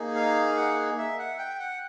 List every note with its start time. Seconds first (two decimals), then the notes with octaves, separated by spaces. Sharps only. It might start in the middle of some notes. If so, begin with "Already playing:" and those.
Already playing: A#3 D#4 G#4
0.15 F5
0.57 F#5
0.98 E5
1.19 F#5
1.39 G5
1.60 F#5